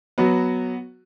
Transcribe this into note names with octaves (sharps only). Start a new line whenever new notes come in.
F#3 B3 F#4